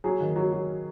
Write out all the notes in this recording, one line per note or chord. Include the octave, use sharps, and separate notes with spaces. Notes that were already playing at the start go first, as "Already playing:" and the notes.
F#3 G#4
D#3
F#3
F#3